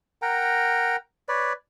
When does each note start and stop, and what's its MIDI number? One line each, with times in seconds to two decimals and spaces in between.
0.22 0.96 70
0.22 0.96 78
0.22 0.96 79
0.22 0.96 82
1.28 1.53 71
1.28 1.53 73
1.28 1.53 74